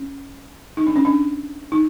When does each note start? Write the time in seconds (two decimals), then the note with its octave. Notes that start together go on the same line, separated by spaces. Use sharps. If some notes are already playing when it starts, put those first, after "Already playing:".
Already playing: C#4
0.77 D#4
0.87 D4
0.96 C#4
1.05 D4
1.72 D#4